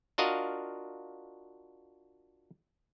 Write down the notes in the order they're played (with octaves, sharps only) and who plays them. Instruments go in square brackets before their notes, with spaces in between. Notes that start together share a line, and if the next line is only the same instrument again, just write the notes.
[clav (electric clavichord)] D4 F4 F#4 A#4 D#5 F5